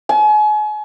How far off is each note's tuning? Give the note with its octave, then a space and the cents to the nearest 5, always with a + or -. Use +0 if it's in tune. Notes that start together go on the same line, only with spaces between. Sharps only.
G#5 +35